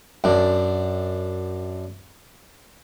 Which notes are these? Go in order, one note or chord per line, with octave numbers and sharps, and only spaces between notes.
F#2 D4